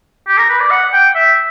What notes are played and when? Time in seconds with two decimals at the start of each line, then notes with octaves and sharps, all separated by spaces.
0.28 G4
0.38 A#4
0.49 B4
0.60 D5
0.70 F#5
0.93 G5
1.15 E5